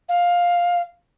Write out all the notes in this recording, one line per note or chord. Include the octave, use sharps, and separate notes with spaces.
F5